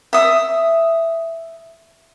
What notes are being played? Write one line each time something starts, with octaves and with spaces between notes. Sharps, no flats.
E5 D#6